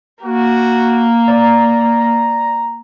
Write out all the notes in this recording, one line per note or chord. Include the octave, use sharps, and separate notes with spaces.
A#3 F#4
D5 A#5